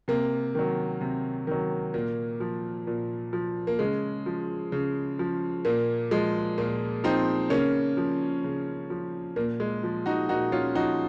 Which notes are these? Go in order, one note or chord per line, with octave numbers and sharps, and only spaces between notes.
C3 A#3
D#3 F#3
C3
D#3 F#3
A#2 A#3
F3
A#2
F3
A#3
C#3 G#3
F3
C#3
F3
A#2 A#3
F3 G#3
A#2 A#3
F3 C4 D#4
C#3 A#3 C#4
F3
C#3
F3
A#2 A#3
G#3
F3
D#4 F#4
A#2 D#4 F#4
C#4 F4
F3 D#4 F#4